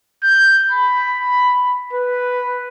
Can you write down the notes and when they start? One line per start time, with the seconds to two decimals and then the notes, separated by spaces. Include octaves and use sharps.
0.24 G6
0.71 B5
1.93 B4